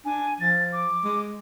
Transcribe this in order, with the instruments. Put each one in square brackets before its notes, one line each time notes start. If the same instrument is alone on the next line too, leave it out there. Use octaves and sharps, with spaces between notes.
[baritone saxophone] D4 [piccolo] G#5
[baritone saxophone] F3 [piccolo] A6
[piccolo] D6
[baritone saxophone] G#3